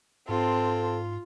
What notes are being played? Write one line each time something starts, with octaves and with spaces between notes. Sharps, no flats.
G#2 C4 F4 A4 A5